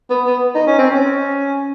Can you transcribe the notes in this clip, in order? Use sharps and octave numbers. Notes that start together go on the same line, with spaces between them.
B3
B3
D#4
C#4
C4
C#4